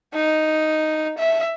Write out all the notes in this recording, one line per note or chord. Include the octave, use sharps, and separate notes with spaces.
D#4
E5